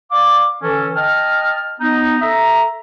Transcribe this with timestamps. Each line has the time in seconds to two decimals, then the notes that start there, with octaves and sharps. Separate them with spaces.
0.12 D5 F5 D6
0.62 D3 E3 C#4 A4
0.96 D#5 G5 A5 F6
1.80 B3 D#4
2.21 A4 E5 A#5